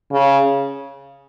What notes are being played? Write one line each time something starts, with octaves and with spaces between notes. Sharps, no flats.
C#3